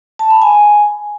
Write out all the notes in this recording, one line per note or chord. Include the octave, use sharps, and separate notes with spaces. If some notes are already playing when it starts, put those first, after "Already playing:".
A5
B5
G#5